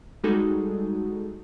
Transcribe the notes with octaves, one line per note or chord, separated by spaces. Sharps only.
G3 G#3 D#4 F#4 G#4 A4